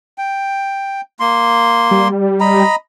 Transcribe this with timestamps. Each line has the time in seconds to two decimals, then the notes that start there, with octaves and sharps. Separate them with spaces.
0.18 G5
1.20 A#3 C6
1.91 G3
2.40 D#5 A#5 B5